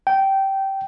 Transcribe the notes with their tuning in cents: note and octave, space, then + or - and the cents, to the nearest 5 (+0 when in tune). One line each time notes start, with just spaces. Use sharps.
G5 -15